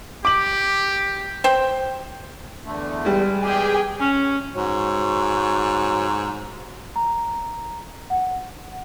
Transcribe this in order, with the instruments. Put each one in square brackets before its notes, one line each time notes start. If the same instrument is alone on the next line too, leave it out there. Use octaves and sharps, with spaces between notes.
[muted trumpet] G4 [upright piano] D6 F#7
[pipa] C5 G5
[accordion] E2 D3 A3
[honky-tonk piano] G3 G#3
[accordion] E2 G4 [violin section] G#4 G5
[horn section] C#4
[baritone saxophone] G#2 [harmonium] F#4 C#5
[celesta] A#5
F#5